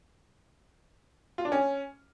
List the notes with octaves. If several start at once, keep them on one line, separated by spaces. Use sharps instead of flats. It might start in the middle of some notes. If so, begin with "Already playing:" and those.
F4
D4
C#4